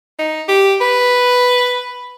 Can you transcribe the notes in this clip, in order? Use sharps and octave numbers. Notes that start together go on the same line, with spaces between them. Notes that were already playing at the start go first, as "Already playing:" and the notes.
D#4
G4
B4